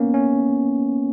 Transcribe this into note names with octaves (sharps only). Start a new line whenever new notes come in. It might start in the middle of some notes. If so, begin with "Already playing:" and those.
Already playing: A#3 B3 C#4
C#4